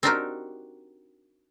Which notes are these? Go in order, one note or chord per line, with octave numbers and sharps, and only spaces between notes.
C4 D4 D#4 F#4 G4 A#4